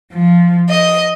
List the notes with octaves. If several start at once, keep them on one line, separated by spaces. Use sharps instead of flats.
F3
D#5